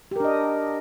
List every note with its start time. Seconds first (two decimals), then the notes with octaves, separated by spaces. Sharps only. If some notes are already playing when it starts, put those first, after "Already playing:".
0.11 G4
0.16 A#4
0.20 D4
0.24 D#5